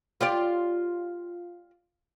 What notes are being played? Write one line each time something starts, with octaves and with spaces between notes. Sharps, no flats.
F4 G4 D5